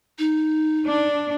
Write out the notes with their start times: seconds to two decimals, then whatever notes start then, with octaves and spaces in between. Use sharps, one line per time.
0.19 D#4
0.86 D4